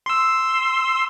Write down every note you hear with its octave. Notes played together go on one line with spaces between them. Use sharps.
C6 E6